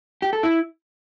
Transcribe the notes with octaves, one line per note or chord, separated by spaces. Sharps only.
G4
A4
E4